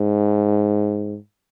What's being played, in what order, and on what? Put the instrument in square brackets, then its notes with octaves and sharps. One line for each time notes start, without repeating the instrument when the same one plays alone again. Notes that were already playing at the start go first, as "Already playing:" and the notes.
Already playing: [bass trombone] G#2